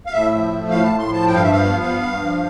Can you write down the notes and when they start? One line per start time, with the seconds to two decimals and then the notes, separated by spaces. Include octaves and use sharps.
0.06 F5
0.12 A2 E5
0.31 F3
0.51 A3
0.69 A2 F5
0.84 A5
0.89 A2
0.98 C6
1.08 F3 A5
1.27 G2 G5
1.34 F5
1.43 F3 E5
1.52 F5
1.64 B3
1.84 G2
2.03 G2
2.22 F3